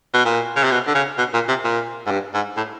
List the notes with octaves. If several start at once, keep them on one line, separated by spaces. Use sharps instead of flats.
B2
A#2
C#3
C3
B2
D3
C#3
B2
A#2
C3
A#2
G#2
G2
G#2
A2